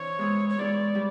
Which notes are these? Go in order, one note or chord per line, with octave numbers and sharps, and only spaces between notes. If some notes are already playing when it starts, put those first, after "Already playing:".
Already playing: E3 C4 D4 C#5
G#3 B3 E4 G#4
C#5
G#3 B3 E4 G#4 D5
G3